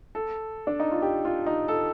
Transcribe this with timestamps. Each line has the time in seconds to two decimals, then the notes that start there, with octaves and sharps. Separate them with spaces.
0.15 A4
0.67 D4
0.80 D#4
0.91 F4
1.02 G4
1.25 F4
1.46 D#4
1.68 A4